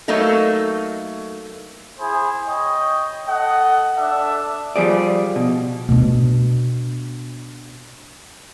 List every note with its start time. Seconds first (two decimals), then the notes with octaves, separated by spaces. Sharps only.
0.08 F#3 A3 A#3 D#4 A4
1.99 E4 G#4 C5
2.47 C#5 D#5 G5
3.28 A4 D#5 F#5
3.97 D4 A4 E5
4.76 F3 G3 G#4 D5
5.36 B2
5.89 B2 D4